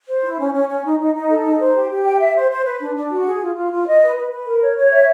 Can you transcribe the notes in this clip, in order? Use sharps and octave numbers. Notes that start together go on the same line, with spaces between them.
C5
E4
C#4
C#4
C#4
D#4
D#4
D#4
A4
D#4
C5
G4
G4
G5
E5
C5
C5
B4
D4
D4
F#4
G#4
F4
F4
F4
D#5
B4
B4
B4
A#4
C#5
C#5
E5